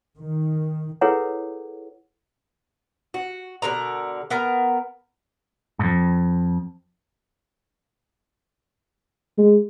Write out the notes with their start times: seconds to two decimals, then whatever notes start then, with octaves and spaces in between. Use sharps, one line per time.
0.18 D#3
1.01 E4 G#4 A4 B4 C#5 F#5
3.14 F#4
3.62 B2 D3 A#4 A#5
4.30 B3 A#4 A#5
5.79 F2 G#2
9.38 G#3